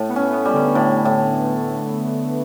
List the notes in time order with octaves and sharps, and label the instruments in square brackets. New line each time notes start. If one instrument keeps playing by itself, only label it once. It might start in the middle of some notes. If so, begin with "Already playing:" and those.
Already playing: [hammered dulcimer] A2 [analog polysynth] A3
[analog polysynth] B3
[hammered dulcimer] C#4
[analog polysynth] B3
[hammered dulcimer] G3
[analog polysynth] D3
[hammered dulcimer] A2 [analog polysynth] D3
[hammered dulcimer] A2